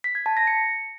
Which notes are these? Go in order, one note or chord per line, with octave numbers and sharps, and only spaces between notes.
B6
G#6
A5
A#6
C#7